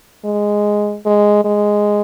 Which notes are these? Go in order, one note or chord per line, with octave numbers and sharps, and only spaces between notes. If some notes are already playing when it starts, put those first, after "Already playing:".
G#3
G#3
G#3